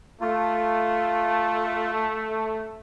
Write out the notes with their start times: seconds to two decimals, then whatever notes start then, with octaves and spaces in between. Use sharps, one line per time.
0.21 A3 F4